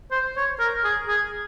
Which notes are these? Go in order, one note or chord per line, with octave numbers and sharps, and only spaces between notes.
C5
C#5
A#4
G#4
G#4